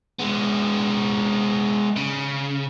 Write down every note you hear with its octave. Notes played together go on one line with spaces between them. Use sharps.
G#3 B3
C#3